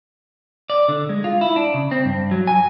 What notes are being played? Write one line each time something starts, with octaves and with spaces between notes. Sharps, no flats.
D5
D3
G#3
F4
E4
D4
C#3
C4
G2
F#3
G#5